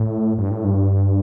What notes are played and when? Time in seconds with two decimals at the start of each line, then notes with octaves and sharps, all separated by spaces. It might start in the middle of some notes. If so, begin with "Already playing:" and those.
Already playing: A2
0.38 G2
0.51 A2
0.64 G2